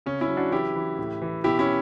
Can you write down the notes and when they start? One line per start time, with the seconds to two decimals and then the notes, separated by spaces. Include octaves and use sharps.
0.06 C#3 C#4
0.21 C#4 E4
0.28 F#3
0.37 D4 F#4
0.51 E3 E4 G4
0.76 E3
0.98 A2
1.22 E3
1.44 B2 E4 G4
1.59 C#4 E4